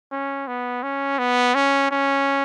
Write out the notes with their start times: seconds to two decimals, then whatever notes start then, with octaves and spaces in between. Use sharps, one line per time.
0.11 C#4
0.48 B3
0.83 C#4
1.19 B3
1.55 C#4
1.91 C#4